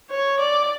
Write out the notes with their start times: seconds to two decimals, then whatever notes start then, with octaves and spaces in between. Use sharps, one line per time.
0.11 C#5
0.40 D5